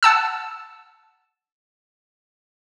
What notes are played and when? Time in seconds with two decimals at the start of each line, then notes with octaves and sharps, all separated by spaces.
0.03 F#5 A5 E6